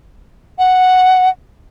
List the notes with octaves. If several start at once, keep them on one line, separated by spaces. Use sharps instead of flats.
F#5